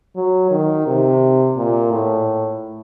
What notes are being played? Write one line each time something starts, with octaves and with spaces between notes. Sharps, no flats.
F#3
D#3
C3
A#2
A2